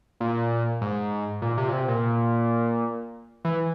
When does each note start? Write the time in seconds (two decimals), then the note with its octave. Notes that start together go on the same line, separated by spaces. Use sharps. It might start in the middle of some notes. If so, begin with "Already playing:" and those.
0.20 A#2
0.81 G#2
1.42 A#2
1.58 C3
1.69 A#2
1.73 C3
1.88 A#2
3.45 E3